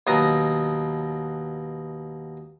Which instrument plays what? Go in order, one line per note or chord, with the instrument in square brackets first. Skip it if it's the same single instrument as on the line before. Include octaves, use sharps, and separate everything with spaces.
[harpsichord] D#2 B2 F#3 D#5 A#5